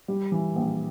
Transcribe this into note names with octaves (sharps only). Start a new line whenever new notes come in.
G3
E3
A#1